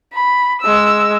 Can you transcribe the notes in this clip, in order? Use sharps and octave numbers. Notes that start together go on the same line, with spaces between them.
B5
G#3 E6